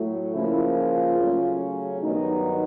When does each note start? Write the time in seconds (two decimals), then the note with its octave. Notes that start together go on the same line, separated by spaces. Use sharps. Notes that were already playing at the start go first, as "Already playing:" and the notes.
Already playing: A2 F#3 A3
0.33 C#3 F3 A#3 E4
0.76 F4
1.18 C#3 F#3 A3 C#4
2.01 G2 D#3 F#3 B3 D#4